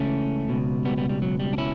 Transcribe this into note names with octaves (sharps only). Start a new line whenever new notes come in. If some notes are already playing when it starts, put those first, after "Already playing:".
Already playing: C#2 C#3 E3 A3 C#4
C#2 B2
G3 B3
G3 B3
G3
F#3
G3
D4
C#4 E4